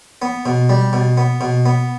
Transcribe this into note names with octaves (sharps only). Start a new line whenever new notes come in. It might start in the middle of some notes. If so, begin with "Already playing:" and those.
B3
B2
G3
B2
B3
B2
B3